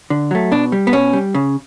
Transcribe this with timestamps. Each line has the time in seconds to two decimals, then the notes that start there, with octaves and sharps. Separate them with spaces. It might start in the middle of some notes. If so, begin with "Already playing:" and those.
0.10 D3
0.31 F#3 A3
0.52 B2 D4
0.72 G3
0.87 B3
0.93 B2 C#4
1.13 G3
1.34 C#3